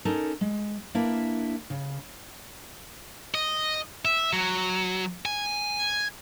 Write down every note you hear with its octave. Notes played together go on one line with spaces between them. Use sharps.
C#4 D#4 A4 A#4
G#3
A#3 D4 E4 A#4 B4
C#3
D#5
E5
F#3
G#5